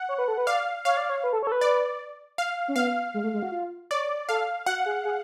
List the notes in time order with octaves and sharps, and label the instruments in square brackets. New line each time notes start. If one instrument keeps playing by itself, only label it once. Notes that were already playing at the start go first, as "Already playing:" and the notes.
Already playing: [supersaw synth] F#5
[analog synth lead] C#5
B4
A4
B4
[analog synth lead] D5 [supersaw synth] F5
[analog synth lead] C#5 [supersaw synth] F5
[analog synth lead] D5
C#5
B4
A4
C#5
A4
B4
[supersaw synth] D5
F5
[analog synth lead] C#4
[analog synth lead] B3 [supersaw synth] F5
[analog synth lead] G#3
A3
G#3
F#4
F4
[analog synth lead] C#5 [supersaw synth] D5
[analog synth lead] A4 [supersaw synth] F5
[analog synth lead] F#4 [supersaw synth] F#5
[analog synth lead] G#4
G#4